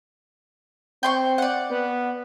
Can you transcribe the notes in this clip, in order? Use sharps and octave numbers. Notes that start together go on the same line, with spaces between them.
C4 G5 C6 C#6
D5 F#5
B3